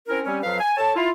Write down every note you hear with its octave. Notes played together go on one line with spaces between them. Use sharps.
C4 C#4 E4 A#4
G3 C4 C#4
F2 F#3 B4 F5
G#5
A4 C#5 A5
E4 F4